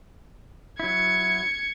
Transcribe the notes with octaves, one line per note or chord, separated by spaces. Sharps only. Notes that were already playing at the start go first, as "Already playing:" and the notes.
F#3 E4 G#6 C#7